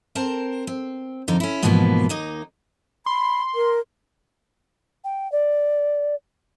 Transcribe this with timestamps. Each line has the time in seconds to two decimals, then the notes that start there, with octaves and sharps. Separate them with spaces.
0.15 C4 A#4 C5 A5
0.67 C4
1.28 F2 D3 D#4 A#4
1.40 C#4 E4
1.62 G#2 B2 E3 F3 A#3 B3
2.09 D#2 A#3 D#4 D#5
3.06 B5 C6
3.55 A#4
5.04 G5
5.32 D5